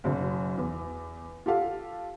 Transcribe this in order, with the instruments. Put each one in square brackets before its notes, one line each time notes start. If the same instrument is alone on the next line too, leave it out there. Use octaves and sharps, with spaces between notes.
[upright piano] F#1 B1 F#2
E2
F4 G4 A4 F5